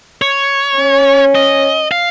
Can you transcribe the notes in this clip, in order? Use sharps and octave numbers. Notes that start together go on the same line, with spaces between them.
C#5
C#4
D#5
F5